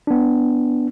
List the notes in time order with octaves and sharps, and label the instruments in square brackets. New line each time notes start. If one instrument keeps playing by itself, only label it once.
[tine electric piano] B3 D4